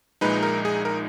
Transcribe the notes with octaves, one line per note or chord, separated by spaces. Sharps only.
A#1 A#2 G#3 D#4 B4
A#4
G#4
A#4